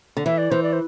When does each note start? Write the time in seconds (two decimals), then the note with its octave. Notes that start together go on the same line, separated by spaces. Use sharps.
0.17 D3
0.25 E3 E5
0.38 D5
0.51 E3 C5
0.63 D5
0.73 C5